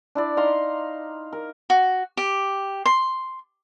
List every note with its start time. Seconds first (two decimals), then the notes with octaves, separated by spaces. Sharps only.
0.15 D4 E4 D5
0.37 D#4 F5 A#5 C6
1.33 A#4
1.70 F#4
2.17 G4
2.86 C6